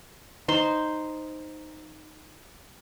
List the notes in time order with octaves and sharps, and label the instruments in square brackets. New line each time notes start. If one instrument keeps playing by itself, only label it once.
[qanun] D#4 C5 C6